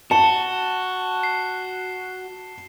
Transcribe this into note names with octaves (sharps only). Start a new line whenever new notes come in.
F#4 A5 C#7 E7 G7
C7